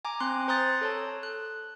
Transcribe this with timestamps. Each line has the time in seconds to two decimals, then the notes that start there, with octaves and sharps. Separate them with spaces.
0.05 G#5 A#5 D6
0.20 C4 C6 F#6
0.48 C5 A#5 C6 D#6 F#6 A6
0.81 A4 C#5 A5
1.23 F#6